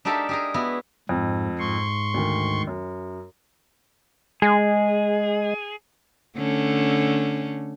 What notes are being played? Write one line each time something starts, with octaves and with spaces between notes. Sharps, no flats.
D4 D#4 G4 A4 A#4 E5
G4 G#4 A#4
B3 E4 F#4
F2 G#2
G#2 C6 C#6
D2 D#3
F#2
G#3 G#4
D3 A3 C#4